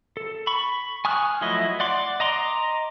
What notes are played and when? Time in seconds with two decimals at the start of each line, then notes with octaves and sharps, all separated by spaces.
0.17 A4
0.47 B5 C#6
1.05 G#5 C#6 D#6 F6 F#6
1.41 F3 F#3 A3 E4 D#5
1.80 D5 F#5 C6 D6
2.20 D#5 A#5 C6 D6